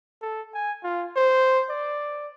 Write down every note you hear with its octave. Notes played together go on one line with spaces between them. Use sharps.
A4
G#5
F4
C5
D5